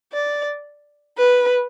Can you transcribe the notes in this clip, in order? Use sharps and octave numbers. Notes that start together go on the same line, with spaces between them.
D5
B4